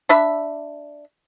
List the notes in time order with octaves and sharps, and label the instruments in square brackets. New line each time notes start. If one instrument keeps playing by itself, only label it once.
[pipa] D4 E5 B5